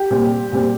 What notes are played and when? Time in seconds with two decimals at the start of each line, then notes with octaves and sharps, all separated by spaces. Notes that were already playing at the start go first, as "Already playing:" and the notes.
Already playing: G4
0.10 A#2 G3 C4
0.52 A#2 G3 C4